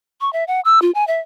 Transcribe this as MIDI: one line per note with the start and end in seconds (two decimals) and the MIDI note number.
0.21 0.32 85
0.33 0.44 76
0.48 0.61 78
0.65 0.79 88
0.82 0.91 65
0.95 1.06 80
1.07 1.20 76